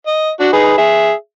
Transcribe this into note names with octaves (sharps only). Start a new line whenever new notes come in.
D#5
D4 F#4
D#4 G#4 B4
G#4 E5